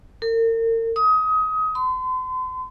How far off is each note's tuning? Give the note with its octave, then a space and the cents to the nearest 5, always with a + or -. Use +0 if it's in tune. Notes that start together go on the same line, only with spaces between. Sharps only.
A#4 -40
D#6 +25
C6 -40